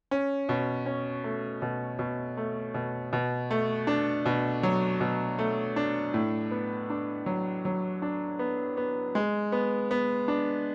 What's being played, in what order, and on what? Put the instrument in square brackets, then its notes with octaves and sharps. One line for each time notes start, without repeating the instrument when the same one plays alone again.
[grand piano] C#4
B2
C#4
A3
B2
B2
A3
B2
B2
A3
D4
B2
F#3
B2
A3
D4
A2
B3
D4
F#3
F#3
D4
B3
B3
G#3
B3
B3
D4